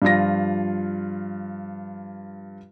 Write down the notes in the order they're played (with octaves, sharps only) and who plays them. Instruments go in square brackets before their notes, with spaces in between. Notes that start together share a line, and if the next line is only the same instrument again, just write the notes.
[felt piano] G2 F3 F4 A#6